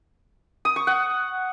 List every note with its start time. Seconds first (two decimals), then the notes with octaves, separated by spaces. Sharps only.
0.65 D#6
0.76 C#6
0.87 F#5